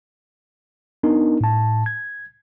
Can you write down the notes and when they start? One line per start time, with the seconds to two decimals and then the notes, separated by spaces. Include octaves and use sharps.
1.03 B3 D4 D#4 A#4
1.41 A2 A5
1.86 G#6